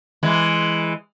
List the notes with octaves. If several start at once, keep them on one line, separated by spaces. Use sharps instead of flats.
E3 G#3